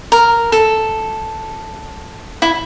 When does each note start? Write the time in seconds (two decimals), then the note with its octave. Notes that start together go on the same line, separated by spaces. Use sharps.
0.12 A#4
0.52 A4
2.42 E4